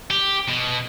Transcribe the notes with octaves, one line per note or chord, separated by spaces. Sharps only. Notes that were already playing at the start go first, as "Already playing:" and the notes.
G4
B2